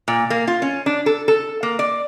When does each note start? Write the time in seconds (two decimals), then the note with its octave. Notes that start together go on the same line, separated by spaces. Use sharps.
0.08 A#2
0.30 A#3
0.48 F4
0.62 C#4
0.86 D4
1.06 A4
1.28 A4
1.63 A#3
1.79 D5